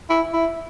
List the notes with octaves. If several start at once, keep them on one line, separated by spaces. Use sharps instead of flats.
E4
E4